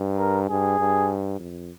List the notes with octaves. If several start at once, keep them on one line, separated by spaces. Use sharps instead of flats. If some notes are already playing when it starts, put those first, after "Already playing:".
Already playing: G2
A#4
G2 G#4
G2
F2